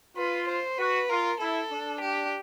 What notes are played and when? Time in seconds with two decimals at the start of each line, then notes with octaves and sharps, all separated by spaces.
0.17 F4 B4
0.48 C5
0.78 F#4 B4
1.09 F4 A#4
1.40 E4 A4
1.71 D4
2.01 G4